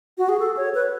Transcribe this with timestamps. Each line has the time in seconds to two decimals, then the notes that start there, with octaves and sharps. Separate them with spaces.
0.18 F#4
0.29 G#4
0.39 A4
0.57 C#5
0.75 B4